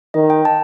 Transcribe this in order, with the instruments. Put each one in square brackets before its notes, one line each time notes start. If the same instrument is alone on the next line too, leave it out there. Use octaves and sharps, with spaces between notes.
[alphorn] D#3 [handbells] D#5
[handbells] G5
A5